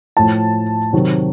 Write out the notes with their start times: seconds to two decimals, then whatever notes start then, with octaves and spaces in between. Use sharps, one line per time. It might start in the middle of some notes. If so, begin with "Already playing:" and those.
0.17 A2 F3 A5
0.93 C3 D#3 F#3